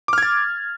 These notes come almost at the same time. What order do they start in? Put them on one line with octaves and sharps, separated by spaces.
D6 F6 G#6 A6